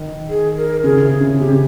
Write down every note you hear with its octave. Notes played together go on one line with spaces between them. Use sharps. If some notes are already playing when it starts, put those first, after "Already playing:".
Already playing: D#3
G#4
A#4
C#3 G#4
C3
C#3
C#3 G4